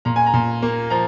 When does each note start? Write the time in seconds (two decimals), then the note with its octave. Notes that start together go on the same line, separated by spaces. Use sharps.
0.05 A#2 A#5
0.16 G#5
0.26 A#5
0.34 A#2
0.62 A#3
0.90 F3 A#5